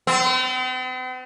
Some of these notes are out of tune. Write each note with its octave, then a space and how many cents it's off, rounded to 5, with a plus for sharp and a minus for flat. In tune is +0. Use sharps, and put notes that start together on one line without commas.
C4 -45